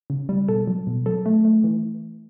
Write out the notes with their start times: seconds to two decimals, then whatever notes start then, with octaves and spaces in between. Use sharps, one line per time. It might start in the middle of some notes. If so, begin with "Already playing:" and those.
0.10 C#3
0.29 G3
0.48 B2 A4
0.67 F#3
0.87 B2
1.06 F#3 A4
1.26 A3
1.45 A3
1.64 E3